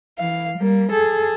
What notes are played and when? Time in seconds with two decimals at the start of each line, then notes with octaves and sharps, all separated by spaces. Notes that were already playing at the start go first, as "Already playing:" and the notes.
0.19 E3 F5
0.58 G3 A#3
0.92 G#4 A4